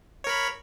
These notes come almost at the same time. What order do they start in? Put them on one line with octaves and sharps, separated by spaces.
C#5 A#4 B5